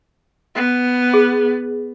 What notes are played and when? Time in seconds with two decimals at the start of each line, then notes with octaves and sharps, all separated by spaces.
0.55 B3
1.14 G#4